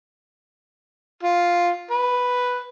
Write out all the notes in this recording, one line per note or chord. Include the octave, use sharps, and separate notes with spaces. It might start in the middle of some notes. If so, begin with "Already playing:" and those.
F4
B4